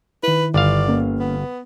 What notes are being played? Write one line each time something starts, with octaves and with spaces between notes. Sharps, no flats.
D#3 E4 B4
G1 D5 F5
A#3 C#4
B3